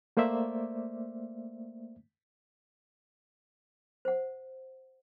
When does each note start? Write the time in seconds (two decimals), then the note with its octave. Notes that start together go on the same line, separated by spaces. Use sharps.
0.17 A3 A#3 C5 D5 E5
4.05 C5 F#5